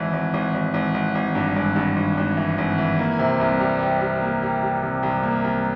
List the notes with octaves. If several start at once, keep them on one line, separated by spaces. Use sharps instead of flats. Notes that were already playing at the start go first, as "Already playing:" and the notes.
Already playing: G#1 E3
G#1
G#1
G#1
G#1
G#1
G#1
G2
G#1
G2
G#1
G#1
E3
G#1
E3
A#3
C3
C2
G3
G3
G3
A#3
G3
G3
C3
C2
A#3
C2